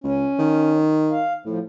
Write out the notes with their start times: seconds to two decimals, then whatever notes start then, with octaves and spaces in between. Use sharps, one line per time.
0.04 C#2 C#4
0.39 D#3
1.11 F5
1.46 A2 F3